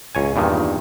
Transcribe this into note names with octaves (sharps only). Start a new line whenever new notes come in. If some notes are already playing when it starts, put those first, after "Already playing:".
C#2 C#5 G#5
E2 G2 A#2 D#3